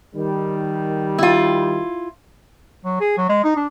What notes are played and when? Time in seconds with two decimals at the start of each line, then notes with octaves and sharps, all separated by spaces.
0.15 D#3 G3
1.18 E4 F4
2.85 F#3
3.01 G#4
3.18 F#3
3.29 G#3
3.44 D#4
3.57 D4